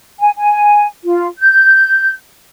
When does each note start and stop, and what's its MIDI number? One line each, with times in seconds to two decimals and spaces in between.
0.20 0.31 80
0.38 0.87 80
1.04 1.27 65
1.40 2.13 91